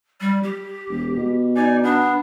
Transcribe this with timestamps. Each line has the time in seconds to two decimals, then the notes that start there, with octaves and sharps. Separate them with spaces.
0.21 G3
0.43 G4
0.89 E1
1.16 B2
1.56 D#4 D5 G#5
1.83 B3 D4